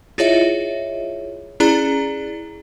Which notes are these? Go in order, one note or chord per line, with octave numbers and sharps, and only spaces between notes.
E4 F4 G#4 C#5 D#5 E5
C#4 E4 G#4 D5 A#5